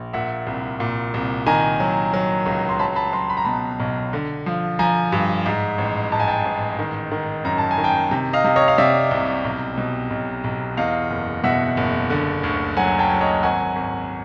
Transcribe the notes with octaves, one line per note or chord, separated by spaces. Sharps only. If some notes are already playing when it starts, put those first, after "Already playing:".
Already playing: A#1
A#2 E5 F#5
C2
A#2
C2
D#3 G#5 A#5
F#3
F#3
C#2
C6
F#3 A5 B5
A5 B5
F#3 A#5 C6
B5
A#5
B2 A5 B5
B1
D3
F3
F3 G#5 A#5
G2
G#2
A1
G#2 A5
G#5
G5 A5
A1
D#3
D#3
F#2 A#5
A5
G#5
D#3
G5 A5
C3
D#5 F5
C3
C#5 D#5
F5
C3 D5 E5
C2
B1
B2
B1
B1
E2 D#5 F5
F#1
B2 E5 F#5
F#1
D3
D2
F#3 F#5 G#5
G5 A5
F#3
C#5 D#5
G#1 F#5 G#5
G#1